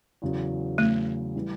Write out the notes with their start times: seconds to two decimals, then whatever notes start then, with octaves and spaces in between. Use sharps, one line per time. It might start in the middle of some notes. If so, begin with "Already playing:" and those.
0.22 E2 C#3 F#3
0.78 E2 C#3 F#3 A3
1.35 E3 G3